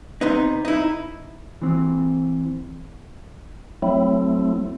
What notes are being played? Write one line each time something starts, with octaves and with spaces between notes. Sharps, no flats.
C3 B3 D#4
D#4 E4
E3 C4
F#3 A3 C4 E4